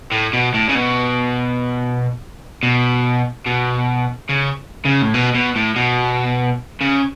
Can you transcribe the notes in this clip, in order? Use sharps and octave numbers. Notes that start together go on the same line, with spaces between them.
A2
B2
A2
C#3
B2
B2
B2
C#3
C#3
A2
B2
B2
A2
B2
C#3